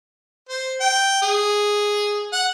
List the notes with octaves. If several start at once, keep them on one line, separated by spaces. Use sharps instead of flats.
C5
G5
G#4
F#5